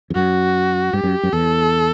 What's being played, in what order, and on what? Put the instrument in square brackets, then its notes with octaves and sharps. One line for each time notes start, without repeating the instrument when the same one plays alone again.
[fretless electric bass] E2
[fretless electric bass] F#2 [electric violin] F#4
[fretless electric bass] G2 [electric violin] G4
[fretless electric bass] F#2
F#2
[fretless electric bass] E2 [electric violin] A4